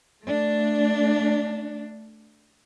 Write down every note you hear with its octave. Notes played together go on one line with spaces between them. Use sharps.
A3 D4